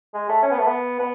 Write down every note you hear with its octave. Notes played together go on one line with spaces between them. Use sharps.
G#3
A3
C#4
B3
A3
B3
B3